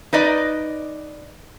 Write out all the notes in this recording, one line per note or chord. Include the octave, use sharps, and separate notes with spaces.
D#4 B4 D5 D#5